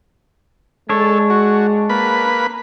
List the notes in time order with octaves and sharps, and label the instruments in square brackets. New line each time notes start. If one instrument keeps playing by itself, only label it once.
[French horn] G#3 [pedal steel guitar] D4 C#5 [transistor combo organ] A4
[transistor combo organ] F#4
A#3 B4 B5